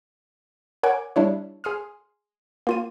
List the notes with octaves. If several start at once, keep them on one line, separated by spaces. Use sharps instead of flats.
A#4 C#5 F#5 G#5 D6
G3 D4 E4 C#5
G#4 C6 D#6 F6
A#3 F4 D#7